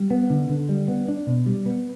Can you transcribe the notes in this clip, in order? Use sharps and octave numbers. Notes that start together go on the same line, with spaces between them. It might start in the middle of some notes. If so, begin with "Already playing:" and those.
Already playing: G3
B3
D3
D3
G3
B3
D4
B2
G3
B3